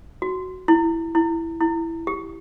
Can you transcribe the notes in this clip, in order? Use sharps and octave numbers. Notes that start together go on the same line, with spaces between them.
F#4
E4
E4
E4
G4